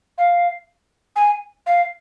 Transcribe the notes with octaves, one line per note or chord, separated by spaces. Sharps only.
F5
G#5
F5